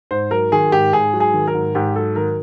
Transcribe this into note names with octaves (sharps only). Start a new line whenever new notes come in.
G#2 C5
F#3 A#4
D#3 G#4
G#2 G4
G#2 G#4
F#3
G#4
D#3
A#4
G#2
G#2 G4
F#3 A4
D#3 A#4